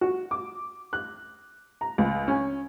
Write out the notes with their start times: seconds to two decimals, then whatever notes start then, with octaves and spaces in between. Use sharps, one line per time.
0.01 F#4
0.31 D6
0.93 F#6
1.81 A#5
1.98 C#2
2.28 C#4